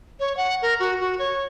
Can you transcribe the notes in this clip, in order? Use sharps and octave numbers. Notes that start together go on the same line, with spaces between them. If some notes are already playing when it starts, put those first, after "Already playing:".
C#5
F#5
A#4
F#4
F#4
C#5